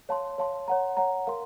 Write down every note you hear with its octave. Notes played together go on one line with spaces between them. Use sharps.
C#5 F5 A5 C6
C#5 F5 A5 C6
C#5 F#5 A#5
C#5 F#5 A#5
A#4 F5 C6